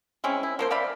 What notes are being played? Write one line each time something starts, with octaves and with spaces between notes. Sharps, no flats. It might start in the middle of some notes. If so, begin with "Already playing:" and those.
G#3 C4 C#4 E4
E4
F3 A#3 C5
D5 E5 F5 B5